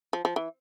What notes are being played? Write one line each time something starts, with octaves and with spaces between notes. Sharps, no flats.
F3
F3
E3